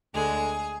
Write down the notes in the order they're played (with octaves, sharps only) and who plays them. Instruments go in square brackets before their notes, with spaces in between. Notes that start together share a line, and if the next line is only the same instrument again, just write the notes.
[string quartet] D2 D3 G#3 G#4